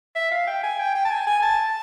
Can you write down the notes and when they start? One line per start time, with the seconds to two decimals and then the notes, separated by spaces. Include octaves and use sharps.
0.16 E5
0.32 F5
0.47 G5
0.63 G#5
0.79 G5
0.95 G5
1.05 A5
1.11 G#5
1.27 G#5
1.43 A5